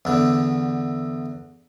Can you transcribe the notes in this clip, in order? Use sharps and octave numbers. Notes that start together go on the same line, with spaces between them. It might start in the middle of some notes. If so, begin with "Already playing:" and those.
E2 D3